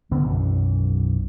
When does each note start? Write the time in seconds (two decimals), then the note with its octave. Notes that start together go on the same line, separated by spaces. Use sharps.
0.11 D3 B3 C4
0.24 B1 F#2 E3